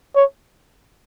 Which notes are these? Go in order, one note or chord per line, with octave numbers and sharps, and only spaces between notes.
C#5